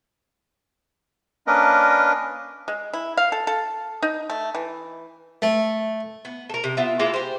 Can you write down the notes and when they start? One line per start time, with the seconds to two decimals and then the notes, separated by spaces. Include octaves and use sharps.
1.47 A#3 C#4 D4 A#4 B4 D#5
2.68 G#3
2.93 E4
3.17 F5
3.32 A4
3.47 A4
4.02 D#4
4.30 A3
4.55 E3
5.42 A3
6.25 B3
6.49 A4 A#4
6.64 C3
6.77 B3 F4 E5
6.99 G#3 A#3 E4 F4
7.14 G4 C5